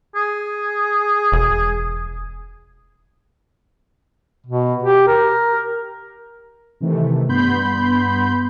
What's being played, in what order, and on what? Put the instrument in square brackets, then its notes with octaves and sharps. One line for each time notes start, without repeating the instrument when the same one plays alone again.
[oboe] G#4
[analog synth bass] E1
[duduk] B2
G4
A#4
[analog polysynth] C3 D#3 E3 A3
G2 B3 B5 C6 G6